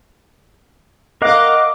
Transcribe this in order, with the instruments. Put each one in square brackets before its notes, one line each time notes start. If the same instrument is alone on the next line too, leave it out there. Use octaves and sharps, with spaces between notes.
[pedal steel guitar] A#4 F5 F#5 [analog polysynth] D#5 D6